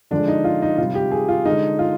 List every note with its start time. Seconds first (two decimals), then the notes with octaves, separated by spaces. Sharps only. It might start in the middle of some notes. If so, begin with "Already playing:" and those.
0.11 D3 F3 G#3 D4
0.28 D#4
0.44 F4
0.62 D#4
0.78 C3 G3 F4
0.95 G4
1.11 G#4
1.29 F4
1.45 D3 G#3 D#4
1.79 F4